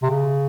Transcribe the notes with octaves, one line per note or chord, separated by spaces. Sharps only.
C3
C#3